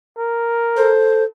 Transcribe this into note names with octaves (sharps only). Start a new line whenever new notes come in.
A#4
A4 C5